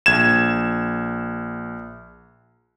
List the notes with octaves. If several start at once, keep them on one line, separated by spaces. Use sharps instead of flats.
A#1 G#6 E7